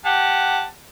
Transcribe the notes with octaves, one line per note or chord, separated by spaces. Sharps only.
G4 F#5 A5